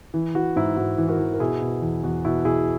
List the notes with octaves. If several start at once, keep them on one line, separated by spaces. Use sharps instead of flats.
E3
E3 F#4
G#2 E4
G#2 F#4
E3
F#4 A#4
E3
A#4
B2 E4 G#4
B2
E2
E2 F#4
B2 E4
B2 E4 G#4